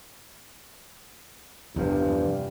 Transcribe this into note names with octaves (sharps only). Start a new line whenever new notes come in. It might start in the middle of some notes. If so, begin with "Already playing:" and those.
E2 G2 C3 F3